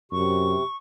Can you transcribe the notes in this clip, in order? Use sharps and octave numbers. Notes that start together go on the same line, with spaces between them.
F#2 C3 C#6